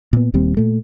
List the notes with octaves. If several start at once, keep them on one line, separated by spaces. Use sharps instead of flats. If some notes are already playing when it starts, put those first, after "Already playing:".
A#2 B3
D#1 D#2 G3 C4
A#2 A3